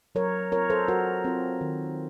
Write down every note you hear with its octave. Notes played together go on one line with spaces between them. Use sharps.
F#3 A#4 C#5
C4 F4 A#4 C#5
A4 C5
F#3 F#4 A#4
C4 F4
D#3